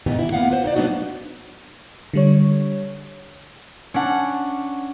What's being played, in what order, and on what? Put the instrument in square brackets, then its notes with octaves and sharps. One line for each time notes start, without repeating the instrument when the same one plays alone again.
[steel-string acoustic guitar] G#2 B2 D#3 E3 B3 G4
E4
A#3 B3 F5 F#5
F4 B4 C5
D#4 C5 D5
F#3 A#3 B3 D4 D#4 F#4
[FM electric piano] D3 G3 C#5
[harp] C#4 D4 F#5